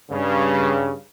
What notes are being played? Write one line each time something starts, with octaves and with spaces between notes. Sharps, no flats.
G2 C#3